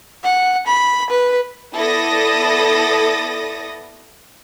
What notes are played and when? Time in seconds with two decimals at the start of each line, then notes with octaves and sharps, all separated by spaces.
0.24 F#5
0.67 B5
1.10 B4
1.74 B3 E4 A4 D5 D#6 A#6